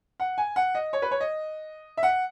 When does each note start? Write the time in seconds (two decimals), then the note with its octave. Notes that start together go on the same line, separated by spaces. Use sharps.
0.20 F#5
0.38 G#5
0.56 F#5
0.75 D#5
0.93 C#5
1.02 B4
1.11 C#5
1.20 D#5
1.97 E5
2.03 F#5